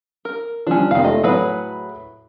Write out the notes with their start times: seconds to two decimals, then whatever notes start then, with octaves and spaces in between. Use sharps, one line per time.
0.25 A#4
0.67 F3 G3 C#4 D4
0.91 F1 D#3 F5
1.04 A3 D#4 F4 D#5
1.24 A2 F#3 G#4 B4 C#5 B5